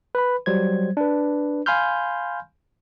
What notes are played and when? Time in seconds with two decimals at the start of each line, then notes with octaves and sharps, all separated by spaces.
0.15 B4 B5
0.46 F#3 G3 C5 G#6
0.97 D4 B4
1.66 F5 G#5 B5 C6 F6 G6